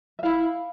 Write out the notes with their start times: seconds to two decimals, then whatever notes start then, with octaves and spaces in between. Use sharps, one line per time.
0.19 E5
0.23 E4 F5